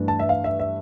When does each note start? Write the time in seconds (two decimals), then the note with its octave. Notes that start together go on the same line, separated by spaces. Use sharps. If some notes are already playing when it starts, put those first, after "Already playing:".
Already playing: G2 E3 A3 D4
0.08 A5
0.19 E5
0.29 F5
0.44 E5
0.59 E5